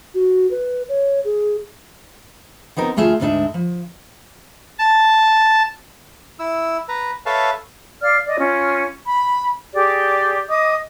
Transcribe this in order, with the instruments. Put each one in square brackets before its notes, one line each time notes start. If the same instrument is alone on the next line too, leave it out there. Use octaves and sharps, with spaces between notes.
[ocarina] F#4
B4
C#5
G#4
[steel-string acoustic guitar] B3 C4 D#4 A#4
D2 A3 F4 G#4 E5
D2 G#2 G#3 D4 D#4 E5
F3
[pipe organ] A5
[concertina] E4 E6
B4 A#5
A4 B4 C#5 E5 F5 A5
[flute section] D5 F5 F6
D5 D#5
C#4 F4
B5
G4 G#4 D5
D#5 D6 D#6